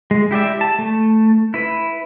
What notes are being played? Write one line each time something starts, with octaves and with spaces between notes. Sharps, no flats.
G#3
E4 G4 D5 E5
A5
A3
E4 B4